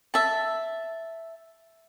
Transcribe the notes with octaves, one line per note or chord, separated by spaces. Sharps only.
E5 A5